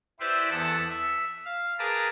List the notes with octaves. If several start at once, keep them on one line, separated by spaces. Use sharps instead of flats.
E4 G4 B4 C5 D5 E5
E2 B3 A4 F#5 A5 E6
E5
F5
G#4 A#4 B4 A5 A#5 D6